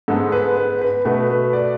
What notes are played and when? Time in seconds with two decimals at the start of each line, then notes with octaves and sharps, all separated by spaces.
0.08 G#2 G#3 B3 A4
0.32 B4
0.57 B4
0.82 B4
1.05 B2 A3 B4
1.30 B4
1.53 D5